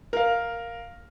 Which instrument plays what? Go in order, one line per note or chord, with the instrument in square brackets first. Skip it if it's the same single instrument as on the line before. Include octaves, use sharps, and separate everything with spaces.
[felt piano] A#4 F5